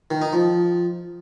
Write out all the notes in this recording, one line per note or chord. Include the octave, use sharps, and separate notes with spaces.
D#3
D#4
F3